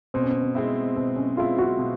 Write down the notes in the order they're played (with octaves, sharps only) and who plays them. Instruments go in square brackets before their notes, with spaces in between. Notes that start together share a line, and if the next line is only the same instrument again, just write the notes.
[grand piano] B2 [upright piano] C4
[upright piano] C#4
C4
C4
[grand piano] G#3 C4 E4
[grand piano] B2 [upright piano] C4
[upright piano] C#4
[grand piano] G#3 C4 E4 [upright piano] F4
[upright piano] F#4
[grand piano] B2